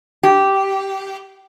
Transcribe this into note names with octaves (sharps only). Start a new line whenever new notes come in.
G4